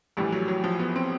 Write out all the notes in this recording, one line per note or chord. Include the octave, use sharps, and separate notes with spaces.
A#1 A2 E3 G3
F#3
F#3
F3
B3
C4